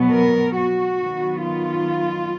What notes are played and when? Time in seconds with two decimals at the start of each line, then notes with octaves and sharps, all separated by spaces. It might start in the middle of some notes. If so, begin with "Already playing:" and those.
Already playing: B2 F#3 B3
0.13 A#4
0.55 F#4
0.99 D#3 F#3 B3
1.41 F4